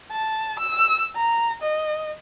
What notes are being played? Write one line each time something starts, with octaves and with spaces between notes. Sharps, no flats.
A5
E6
A#5
D#5